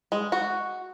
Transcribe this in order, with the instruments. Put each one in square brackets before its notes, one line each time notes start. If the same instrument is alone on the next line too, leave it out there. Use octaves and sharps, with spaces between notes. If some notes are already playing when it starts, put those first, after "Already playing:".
[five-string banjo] G#3
F#4